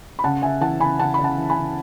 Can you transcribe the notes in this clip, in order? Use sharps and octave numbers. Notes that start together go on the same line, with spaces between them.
B5
C#3 F#5 A5
C#3 E5 G#5
E3 F#5 A5
C#3 G#5 B5
C#3 F#5 A5
C#3 B5
F#5 A5
E3
G#5 B5
C#3